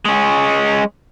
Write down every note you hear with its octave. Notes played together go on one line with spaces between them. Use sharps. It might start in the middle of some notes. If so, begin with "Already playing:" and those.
G#3 C#4